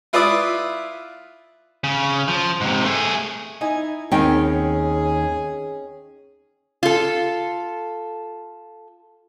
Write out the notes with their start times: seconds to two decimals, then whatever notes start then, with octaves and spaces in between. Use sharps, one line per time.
0.13 E4 F4 B4 D5 E5 D#6
1.84 C#3
2.28 F3
2.61 G#2 C3
2.84 A3 G#4
3.61 D#4 E4 G#5
4.12 D#2 C4 C#4 D#4 G#4 G5
6.83 F4 A4